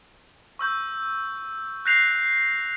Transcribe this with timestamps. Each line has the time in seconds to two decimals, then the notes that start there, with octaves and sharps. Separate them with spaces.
0.59 C#6 E6 G6
1.86 F#6 G6 A#6 C7 F7